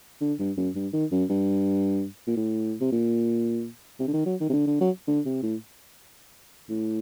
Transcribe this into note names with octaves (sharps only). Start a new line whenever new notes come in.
D3
G2
F#2
G2
D#3
F#2
G2
A#2
A2
C3
A#2
C3
D3
D#3
F#3
D#3
C3
D3
D3
F#3
D3
C3
A2
A2